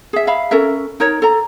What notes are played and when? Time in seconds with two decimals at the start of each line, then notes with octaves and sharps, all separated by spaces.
0.13 G#4 E5
0.27 E5 F5 B5
0.51 C#4 A4 A#4 E5
1.00 D#4 A#4 C#5
1.22 A4 A#5